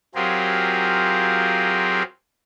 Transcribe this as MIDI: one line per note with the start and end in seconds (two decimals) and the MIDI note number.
0.15 2.03 54
0.15 2.03 60
0.15 2.03 65
0.15 2.03 67
0.15 2.03 68
0.15 2.03 70